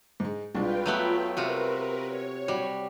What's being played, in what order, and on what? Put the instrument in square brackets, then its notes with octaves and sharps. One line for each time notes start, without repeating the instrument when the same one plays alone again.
[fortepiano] G#2 G#3
[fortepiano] C2 G#3 D4 [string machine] F4 B4 G5
[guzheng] F#3 A3 B3
[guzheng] C3 F4 F#4 [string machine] A#4 B4
[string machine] C#5
[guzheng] G3 [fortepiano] F#4